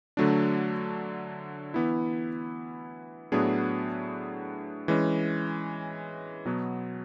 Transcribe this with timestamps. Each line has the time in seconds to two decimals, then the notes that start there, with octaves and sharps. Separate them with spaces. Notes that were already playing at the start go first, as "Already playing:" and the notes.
0.17 D3 F#3 A3 D4
1.74 E3 B3 E4
3.32 A2 F#3 B3 D4 G#4
4.88 E3 G#3 C#4
6.45 B2 F#3 B3